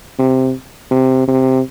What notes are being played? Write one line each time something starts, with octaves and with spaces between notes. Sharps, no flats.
C3
C3
C3